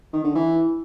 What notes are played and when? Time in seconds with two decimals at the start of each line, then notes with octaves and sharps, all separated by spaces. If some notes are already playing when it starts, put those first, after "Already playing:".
0.13 D#3
0.24 D3
0.35 E3